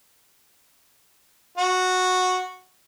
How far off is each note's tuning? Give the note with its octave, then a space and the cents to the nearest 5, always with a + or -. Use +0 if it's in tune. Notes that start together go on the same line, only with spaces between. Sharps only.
F#4 -10